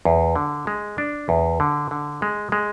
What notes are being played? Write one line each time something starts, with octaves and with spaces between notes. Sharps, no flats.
E2
D3
G#3
D4
E2
D3
D3
G#3
G#3